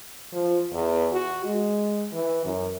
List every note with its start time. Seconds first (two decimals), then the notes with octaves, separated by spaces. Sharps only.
0.33 F3
0.72 E2
1.12 F#4
1.45 G#3
2.13 E3
2.45 F#2